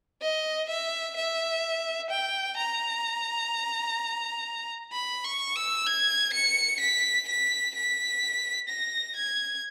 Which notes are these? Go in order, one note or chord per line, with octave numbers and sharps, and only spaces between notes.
D#5
E5
E5
G5
A#5
B5
C#6
E6
G#6
C#7
B6
B6
B6
A#6
G#6